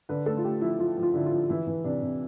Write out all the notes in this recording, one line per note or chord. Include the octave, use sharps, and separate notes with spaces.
D3 B4
A3 A4
F4
A3 G4
F3 E4
F3 F4
F3
F4
D3 E4
F4
F3
E3 E4
E3
C3 D4
C3